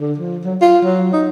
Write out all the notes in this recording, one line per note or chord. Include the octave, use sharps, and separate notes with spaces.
D3
F3
F#3
F4
F#3
D#4